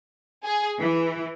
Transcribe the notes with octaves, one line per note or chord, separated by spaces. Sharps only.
G#4
E3